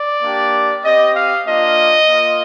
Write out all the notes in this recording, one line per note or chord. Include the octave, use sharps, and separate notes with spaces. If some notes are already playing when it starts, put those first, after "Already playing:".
Already playing: D5
A#3 D4 G4
C4 G4 D#5
F5
A#3 D4 F4 D#5
A#3 F4